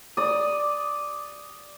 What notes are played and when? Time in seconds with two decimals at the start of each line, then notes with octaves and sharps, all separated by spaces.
0.17 D5 D#6